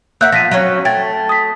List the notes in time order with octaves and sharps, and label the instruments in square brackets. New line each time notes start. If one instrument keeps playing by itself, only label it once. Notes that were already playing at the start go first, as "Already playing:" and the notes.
[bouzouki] A#3 E5 F#5 [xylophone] E6 F#6 G6
[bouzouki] F3 [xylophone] A#6 B6 D#7
[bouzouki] F#3 C4 C#4
[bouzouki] A3 [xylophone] G5 G#6 A6
[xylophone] D#6 B6